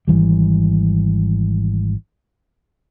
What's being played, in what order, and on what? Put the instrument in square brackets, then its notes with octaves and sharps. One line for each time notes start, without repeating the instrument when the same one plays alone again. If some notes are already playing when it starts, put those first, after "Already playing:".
[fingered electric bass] G#1 D#2 E3 G3